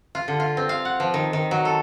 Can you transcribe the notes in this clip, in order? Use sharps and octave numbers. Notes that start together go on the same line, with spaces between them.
F4
D3
F4
C4
F5
F#5
F3
D#3
D#3
F#3
A4